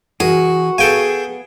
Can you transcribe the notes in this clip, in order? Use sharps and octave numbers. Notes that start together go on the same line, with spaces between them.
E3 F#4 G#4 A#4
B3 G#4 A4 F5 G5 G#5